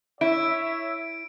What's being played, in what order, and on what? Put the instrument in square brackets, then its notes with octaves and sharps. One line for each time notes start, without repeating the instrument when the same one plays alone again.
[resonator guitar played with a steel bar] E4 [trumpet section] C#5 E5 [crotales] D7